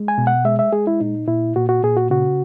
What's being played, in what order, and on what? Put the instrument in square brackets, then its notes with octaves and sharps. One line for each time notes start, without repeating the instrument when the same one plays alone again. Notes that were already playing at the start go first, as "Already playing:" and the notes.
Already playing: [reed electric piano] G#3
G#5
B2
F#5
G#3 E5
E5
G#3 G#4
E4
A#2 D#4
A#2 E4
A#2 F#4
F#4
A#2 G#4
F#4
C#3 F#4